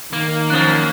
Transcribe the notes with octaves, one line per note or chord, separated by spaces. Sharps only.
D#3 A#3
F#2 F3 F#6